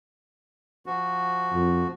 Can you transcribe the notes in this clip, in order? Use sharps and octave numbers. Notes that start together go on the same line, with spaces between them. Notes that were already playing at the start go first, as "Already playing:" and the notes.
F3 F#4
F2